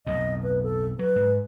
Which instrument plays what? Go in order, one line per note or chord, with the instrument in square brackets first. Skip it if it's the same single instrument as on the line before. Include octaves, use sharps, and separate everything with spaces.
[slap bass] B1 F2 A2 [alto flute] D#5
[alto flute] B4
A4
[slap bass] F#3 [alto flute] B4
[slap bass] G#2